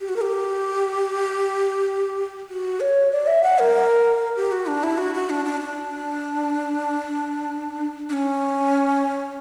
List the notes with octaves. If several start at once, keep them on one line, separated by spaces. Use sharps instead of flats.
G4
F#4
A#4
G4
F#4
C#5
D5
E5
F#5
A#4
G4
F#4
D4
E4
F#4
F#4
D4
D4
D4
D4
C#4